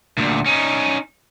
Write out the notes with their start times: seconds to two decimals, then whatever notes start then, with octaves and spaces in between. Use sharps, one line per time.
0.18 D2 A#2
0.46 C#4 D#4